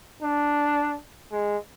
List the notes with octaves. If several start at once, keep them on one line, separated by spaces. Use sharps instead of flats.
D4
G#3